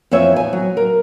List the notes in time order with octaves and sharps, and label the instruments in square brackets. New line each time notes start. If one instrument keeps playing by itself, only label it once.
[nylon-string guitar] F2 E3 C5 C#5 E5
E2 G#5
F#3
A#4